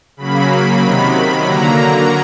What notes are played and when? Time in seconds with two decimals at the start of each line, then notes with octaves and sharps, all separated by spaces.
0.17 C#3 F#3 A#3 B5
0.80 C3 D#3 F#3 B5
1.44 D3 F#3 A#3 A#5